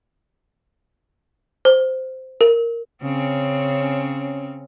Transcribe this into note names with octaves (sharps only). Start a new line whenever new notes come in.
C5
A#4
C#3 C4 C#4